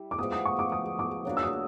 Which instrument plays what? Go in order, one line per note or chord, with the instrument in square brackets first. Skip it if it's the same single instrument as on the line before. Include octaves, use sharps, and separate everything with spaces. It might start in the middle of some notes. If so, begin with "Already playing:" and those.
Already playing: [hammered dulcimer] G3 E4
[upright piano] D6
[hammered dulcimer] F3 G#3 B3 [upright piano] D#6
[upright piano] D#6
C#6
D6
D#6
D6
[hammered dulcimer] F#3 A#3 D4 F#4
[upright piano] E6
D#6